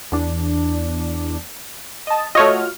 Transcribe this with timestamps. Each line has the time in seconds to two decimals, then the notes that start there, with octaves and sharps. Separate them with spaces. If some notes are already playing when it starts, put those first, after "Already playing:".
0.12 E2 D4
2.07 D#5 A5
2.35 A3 F4 F#4 C#5 D#5 F6